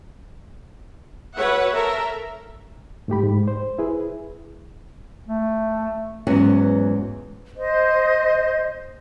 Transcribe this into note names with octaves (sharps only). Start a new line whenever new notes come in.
F#4 B4 C#5 E5 F#5
A4 A#4 E5 A#5
G#2 A3 G4 B5
G#2
C5
E4 G#4 B4
A3
E2 G#2 F#3 G#3 B3 C#4
C5 D#5